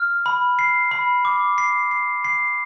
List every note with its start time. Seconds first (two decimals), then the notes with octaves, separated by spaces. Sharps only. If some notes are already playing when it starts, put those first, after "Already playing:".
Already playing: F6
0.26 B5
0.59 C7
0.91 B5
1.25 D6
1.58 C7
1.91 C7
2.24 C7